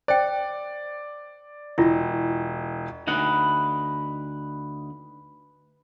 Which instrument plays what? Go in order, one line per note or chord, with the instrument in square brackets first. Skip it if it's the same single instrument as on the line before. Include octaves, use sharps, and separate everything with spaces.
[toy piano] C5 G5 [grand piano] D5
[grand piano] E1 [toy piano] E4 F4
[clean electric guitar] D2 D#4 F#5 [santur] B4 B5